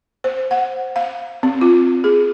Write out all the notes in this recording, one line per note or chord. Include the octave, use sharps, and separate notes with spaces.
C5
F#5
F5
C4
F4
G#4